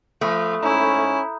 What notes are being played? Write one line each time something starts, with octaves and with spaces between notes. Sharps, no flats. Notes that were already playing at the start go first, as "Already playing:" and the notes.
F3 A3 B5 D#6 F#6
G#2 C#4 E4 A#5 B5 G6